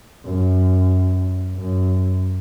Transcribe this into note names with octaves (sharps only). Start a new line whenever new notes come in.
F#2
F#2